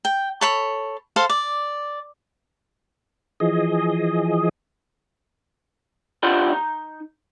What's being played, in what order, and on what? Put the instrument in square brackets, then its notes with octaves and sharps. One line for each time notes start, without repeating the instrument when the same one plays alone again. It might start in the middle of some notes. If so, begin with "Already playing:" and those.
[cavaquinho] G5
A4 C#5 B5
A4 C5 F5 C6
D5
[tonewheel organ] E3 F3 G#4 D#5
[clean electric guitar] D4 E4 F4 G4 D5 F#5
D#4